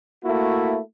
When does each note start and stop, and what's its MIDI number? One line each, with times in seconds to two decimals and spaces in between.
0.24 0.79 57
0.24 0.79 58
0.24 0.79 64
0.24 0.79 66